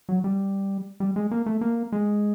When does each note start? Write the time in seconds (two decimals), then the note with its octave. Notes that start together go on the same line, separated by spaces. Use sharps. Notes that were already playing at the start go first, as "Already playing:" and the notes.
0.09 F#3
0.24 G3
1.00 G3
1.16 G#3
1.31 A#3
1.46 A3
1.61 A#3
1.92 G#3